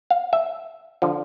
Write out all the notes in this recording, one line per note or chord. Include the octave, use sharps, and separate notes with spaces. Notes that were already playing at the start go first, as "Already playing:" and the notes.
F5
E5
D3 F3